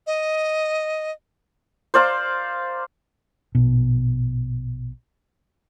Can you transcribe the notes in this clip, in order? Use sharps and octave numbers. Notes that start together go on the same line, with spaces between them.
D#5
C5 D5 F5 A#5
A#1 B2